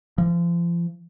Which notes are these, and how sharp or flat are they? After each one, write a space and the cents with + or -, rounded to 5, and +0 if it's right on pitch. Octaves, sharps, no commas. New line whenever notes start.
F3 -35